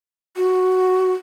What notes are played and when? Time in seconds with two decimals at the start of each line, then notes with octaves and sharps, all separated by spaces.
0.37 F#4